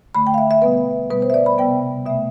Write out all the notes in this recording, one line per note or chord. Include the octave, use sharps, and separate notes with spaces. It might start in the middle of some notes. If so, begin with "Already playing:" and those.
D3 A3 B5
G5
F5
E5
E5
B2 G3 B3 B4
B2 G3 B3 B4
C5
E5
D5
B5
C3 G3 B3 G5
B2 A3 E5